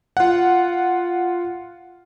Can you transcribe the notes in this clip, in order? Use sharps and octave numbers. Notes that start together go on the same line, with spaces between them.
F4 F#5